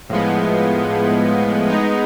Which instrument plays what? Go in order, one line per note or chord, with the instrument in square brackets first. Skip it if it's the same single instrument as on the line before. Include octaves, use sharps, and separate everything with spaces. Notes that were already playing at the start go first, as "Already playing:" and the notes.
[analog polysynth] A2 F3 G#3 B3
G#3 B3 D#4